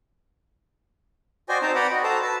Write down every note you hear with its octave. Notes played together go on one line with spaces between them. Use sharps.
F#4 C5 D5 D#5 G5 G#5
C4 D#4 C5 D#5 A5 A#5
B4 D5 F#5 G5 A#5 B5
F#4 D#5
F#4 A4 C5 A5 A#5
B4 A5 E6